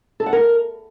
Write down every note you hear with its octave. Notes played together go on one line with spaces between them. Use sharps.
A4
F#5
A#4